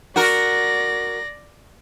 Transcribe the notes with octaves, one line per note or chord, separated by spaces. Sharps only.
F#4 A#4 D5 A#6